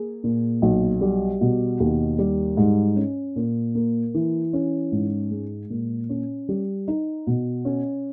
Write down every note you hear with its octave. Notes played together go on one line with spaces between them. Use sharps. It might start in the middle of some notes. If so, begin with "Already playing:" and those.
Already playing: A#3 G#4
A#2
B1
G3
B2
D#2
G3
G#2
C#4
A#2
A#3
E3
C#4
G#2
G#3
A#2
C#4
G3
D#4
B2
C#4